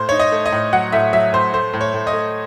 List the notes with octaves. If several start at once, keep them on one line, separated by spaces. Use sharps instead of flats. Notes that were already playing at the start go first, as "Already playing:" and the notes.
Already playing: A2 C5
D#4 C#5
D#5
A3
D#5
A2
F#3 F#5
A2 E5
F#3 E5
A2 C5
A3 C5
A2
C#5
A2
D#5
A3